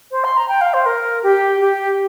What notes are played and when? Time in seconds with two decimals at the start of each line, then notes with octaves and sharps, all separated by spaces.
0.11 C5
0.24 C6
0.37 A#5
0.49 G5
0.61 F5
0.74 C5
0.86 A#4
1.23 G4
1.61 G4